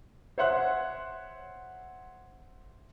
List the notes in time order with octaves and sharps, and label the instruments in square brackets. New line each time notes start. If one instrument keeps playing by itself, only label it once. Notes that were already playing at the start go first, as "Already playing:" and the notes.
[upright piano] C5 C#5 E5 F#5 C6 F#6